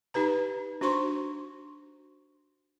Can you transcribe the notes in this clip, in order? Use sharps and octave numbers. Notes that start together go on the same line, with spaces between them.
D#4 G4 B4 A#5
D4 F#4 C5 C6 C#6